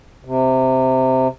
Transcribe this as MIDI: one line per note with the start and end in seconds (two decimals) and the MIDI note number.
0.25 1.28 48